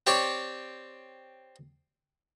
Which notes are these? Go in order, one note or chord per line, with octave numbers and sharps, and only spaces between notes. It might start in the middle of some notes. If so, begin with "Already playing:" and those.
C4 G4 C#5 D5 C#6